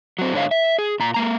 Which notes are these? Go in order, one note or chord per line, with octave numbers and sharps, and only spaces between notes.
F#3 C4
G#2 D3 C#5 D#5 F5
E5
G#4
A#2 A#5
G#3 A#3 A#5